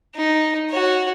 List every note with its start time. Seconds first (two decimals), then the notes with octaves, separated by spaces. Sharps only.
0.16 D#4
0.70 F#4 C#5